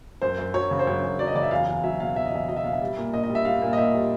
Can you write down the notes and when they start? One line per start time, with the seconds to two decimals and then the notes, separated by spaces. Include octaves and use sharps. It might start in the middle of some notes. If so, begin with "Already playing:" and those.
0.22 F#2 C5
0.38 F#2
0.54 F#3 C#5
0.71 C#3
0.79 C5
0.87 F#2 C#5
1.03 F#2
1.19 F#3 D5
1.27 D#5
1.35 C#3 D5
1.43 E5
1.51 E2 F5
1.68 E2
1.84 F#3 E5
2.00 B2 F5
2.16 E2 E5
2.26 D#5
2.32 E2 E5
2.48 F#3 D#5
2.57 E5
2.64 B2 F5
2.73 E5
2.81 G3
2.97 A#2
3.13 A#2 D#5
3.24 D#5
3.30 G3
3.35 E5
3.45 G3 F5
3.62 A#2
3.73 D#5
3.77 A#2 E5
3.94 G3